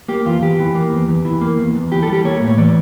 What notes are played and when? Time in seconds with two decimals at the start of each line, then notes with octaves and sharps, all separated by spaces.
0.08 A#3 G4
0.26 E2 F4
0.41 E2 G4
0.59 E3
0.75 A#3
0.92 E2
1.08 E2
1.25 E3
1.41 A#3
1.58 E2
1.75 E2
1.91 E3 G4
2.03 A4
2.07 G3
2.13 G4
2.25 A#3 C#5
2.41 A2
2.47 C#5
2.58 E3 D5